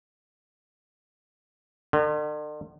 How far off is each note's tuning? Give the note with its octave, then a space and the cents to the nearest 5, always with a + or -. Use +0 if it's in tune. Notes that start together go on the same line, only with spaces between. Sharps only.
D3 +45